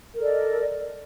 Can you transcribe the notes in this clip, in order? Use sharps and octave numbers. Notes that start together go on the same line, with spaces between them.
A4 A#4 D5 D#5